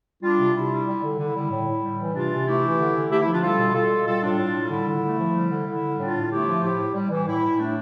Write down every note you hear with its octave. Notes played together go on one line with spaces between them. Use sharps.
G3 D4 F4
C3
C3 E4
G3
G3
D3
D3 E4
G3
A2
A2
G3
E3
C3 D4 F4
C3
A3 E4 G4
E3
D3
D3
A3 E4 G4
E4
F3
D4 F4
G3 F4 A4
B2
B2 F4 A4
G3
G3 F4 A4
A2 D4 F4
A2
G3
D3 E4
D3
A3
F3
G3
D3
D3 E4
G3
A2 D4 F4
A2
A3 E4 G4
F3
A2 E4 G4
A2
G3
E3
A2 E4
A2
A3 D4